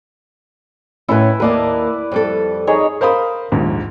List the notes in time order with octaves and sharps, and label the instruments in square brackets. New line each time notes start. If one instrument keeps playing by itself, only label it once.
[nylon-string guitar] A2 C#4 [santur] E4 B4
[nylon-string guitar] D#2 A#3 D#5 [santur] B4 D5 A5
[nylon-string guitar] F2 G3 A4
[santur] D#4 G#4 C#5
[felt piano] A#4 C5 F5 B5 D#6
A#1 D#2 G#2